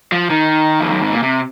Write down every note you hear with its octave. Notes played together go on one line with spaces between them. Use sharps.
F3
D#3
F2
F#2
G#2
A#2
C3